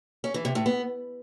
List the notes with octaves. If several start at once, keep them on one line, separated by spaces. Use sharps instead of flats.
C#4
E3
C3
A2
B3